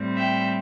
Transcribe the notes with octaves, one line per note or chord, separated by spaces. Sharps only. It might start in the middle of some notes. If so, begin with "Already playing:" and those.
Already playing: A2 G3 C4
E5 G5